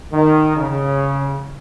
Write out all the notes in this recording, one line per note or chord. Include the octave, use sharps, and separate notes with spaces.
D#3
C#3